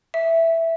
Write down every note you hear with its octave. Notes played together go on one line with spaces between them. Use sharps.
E5